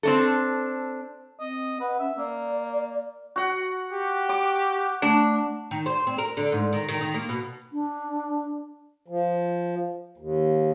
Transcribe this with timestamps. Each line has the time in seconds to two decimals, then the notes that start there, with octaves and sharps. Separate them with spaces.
0.03 C4 D4 A4
1.40 C4 D#5
1.80 B4 F#5
1.99 C#4 E5
2.18 A#3 D5
3.36 F#4 F#5
3.93 G4
4.29 D6
5.02 A3 D4
5.71 D#3
5.86 C5
6.07 C4
6.18 A#4
6.37 D3
6.52 G#2
6.73 D#3
6.88 D#3
7.01 D#3
7.14 A#3
7.29 B2
7.73 D4
9.08 F3
10.18 D#2